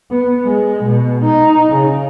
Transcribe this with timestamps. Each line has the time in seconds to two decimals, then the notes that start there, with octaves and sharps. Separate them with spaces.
0.11 B3
0.46 G#3
0.84 B2
1.25 D#4
1.74 C#3